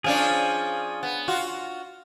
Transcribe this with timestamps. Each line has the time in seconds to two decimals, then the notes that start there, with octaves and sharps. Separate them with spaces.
0.04 F3 C#4 D4 G#4 F5
1.03 B3
1.28 F4 F#4